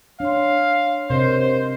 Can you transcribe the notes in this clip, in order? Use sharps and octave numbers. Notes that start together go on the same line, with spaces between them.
D4 C#5 F5 C6
C3 A#4 C5 D#5